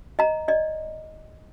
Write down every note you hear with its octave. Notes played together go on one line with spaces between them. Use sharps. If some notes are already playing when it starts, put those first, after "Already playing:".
D#5 A#5
D5 D#5